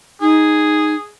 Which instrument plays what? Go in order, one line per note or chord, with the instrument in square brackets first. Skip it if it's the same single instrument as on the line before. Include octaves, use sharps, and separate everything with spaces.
[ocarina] D#4 [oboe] G#4